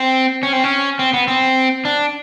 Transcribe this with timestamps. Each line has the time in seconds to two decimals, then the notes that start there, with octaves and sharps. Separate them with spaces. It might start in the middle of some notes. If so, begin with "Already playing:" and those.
Already playing: C4
0.43 C#4
0.53 C4
0.64 C#4
0.99 C4
1.13 B3
1.28 C4
1.85 D4